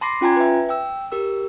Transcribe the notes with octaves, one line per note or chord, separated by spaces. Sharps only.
A5 B5 C6 D6 A#6 C7
C#4 F4 G5 G#5 A#5 G#6
B4 E5
G5 E6
G4 A#4 E6